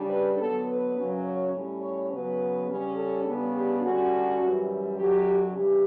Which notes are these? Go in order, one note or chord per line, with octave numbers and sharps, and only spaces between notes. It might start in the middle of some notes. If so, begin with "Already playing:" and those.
Already playing: C#3 G3 D4
B4
D3 F#3 B3 A4
B4
F#2 C#3 F#3 C#4
C#5
A2 G3 C#4
C#5
C#3 F#3 B3 B4
C#3 G3 C#4
A4
C#3 G3 B3 D4
G4
D3 G3 C#4 F#4
F#2 E3 G3
F#2 D3 F#3 G4
C#3 E3 G3 D4 G4